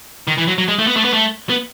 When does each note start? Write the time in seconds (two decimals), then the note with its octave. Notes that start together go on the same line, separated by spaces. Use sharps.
0.28 D#3
0.38 E3
0.48 F#3
0.58 F#3
0.68 G#3
0.79 A3
0.87 B3
0.96 A3
1.05 B3
1.13 A3
1.50 B3